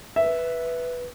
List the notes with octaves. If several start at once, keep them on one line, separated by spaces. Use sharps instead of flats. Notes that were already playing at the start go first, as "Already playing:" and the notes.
B4 E5